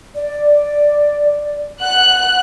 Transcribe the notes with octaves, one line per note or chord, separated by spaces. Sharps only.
D5
F#5 F#6